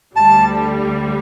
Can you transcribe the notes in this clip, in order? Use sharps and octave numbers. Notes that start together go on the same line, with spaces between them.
D2 D3 G3 A5